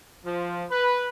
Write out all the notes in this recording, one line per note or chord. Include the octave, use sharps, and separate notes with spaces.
F3
B4